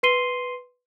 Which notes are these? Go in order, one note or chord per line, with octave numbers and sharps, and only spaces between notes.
B4 C6 C7 D#7 G7